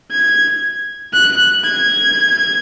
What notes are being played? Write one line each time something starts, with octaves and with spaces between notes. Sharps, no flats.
G#6
F#6
G#6